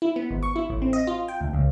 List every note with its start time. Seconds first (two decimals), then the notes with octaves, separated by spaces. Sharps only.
0.02 E4
0.16 B3
0.30 G#1
0.43 C#6
0.56 E4
0.70 A1
0.82 C4
0.93 D#5
1.07 F4
1.28 G5
1.40 D2
1.53 C#2